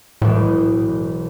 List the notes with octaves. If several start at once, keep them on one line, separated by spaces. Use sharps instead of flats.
E1 B1 A2 E3